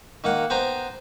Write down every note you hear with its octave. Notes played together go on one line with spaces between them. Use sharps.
D#3 A#3 F#5
B3 C5 G5 G#5 A#5